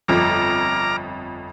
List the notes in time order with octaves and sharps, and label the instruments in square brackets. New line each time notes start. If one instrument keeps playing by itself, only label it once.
[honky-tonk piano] G1 F2 [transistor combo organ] A#5 D6 F6